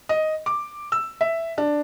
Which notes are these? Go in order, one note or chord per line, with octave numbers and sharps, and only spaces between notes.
D#5
D6
E6
E5
D4